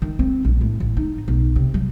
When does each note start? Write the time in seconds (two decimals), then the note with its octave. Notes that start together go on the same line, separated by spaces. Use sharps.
0.02 D#3
0.19 C4
0.45 A#1
0.61 A2
0.80 A1
0.97 D#4
1.28 B1
1.56 C3
1.74 F#3